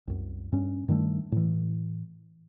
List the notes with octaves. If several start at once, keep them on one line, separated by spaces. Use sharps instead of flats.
C2 F#2
G2 C#4
G2 D#3 G3 A3
A2 E3